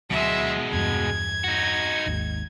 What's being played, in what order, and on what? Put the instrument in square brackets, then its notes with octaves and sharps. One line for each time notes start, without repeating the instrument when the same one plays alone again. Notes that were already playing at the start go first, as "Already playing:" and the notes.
[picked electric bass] D2 F#3 [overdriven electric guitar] B2 G#3 [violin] E5 C6
[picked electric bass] E2 G2 [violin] G#6
[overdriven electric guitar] D#4 F#4
[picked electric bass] G#1 D#2 G#2